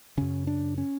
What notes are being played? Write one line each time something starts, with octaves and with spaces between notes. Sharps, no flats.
F#2 C#3 C#4
D4
C#4